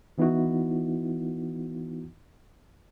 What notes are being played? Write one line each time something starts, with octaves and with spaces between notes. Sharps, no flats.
D#3 E3 B3 D#4 E4 F#4